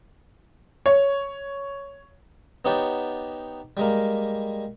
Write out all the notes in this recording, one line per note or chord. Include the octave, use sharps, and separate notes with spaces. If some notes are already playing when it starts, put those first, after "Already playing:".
C#5
B3 D#4 G4 C#5 F#5 A5
G3 G#3 A#3